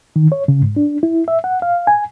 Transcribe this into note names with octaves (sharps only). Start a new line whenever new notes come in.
D#3
C#5
C#3
G#2
D4
E4
E5
F#5
F5
G#5